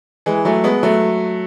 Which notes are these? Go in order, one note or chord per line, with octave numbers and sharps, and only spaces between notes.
E3 G#3
F#3 A3
G#3 B3
F#3 A3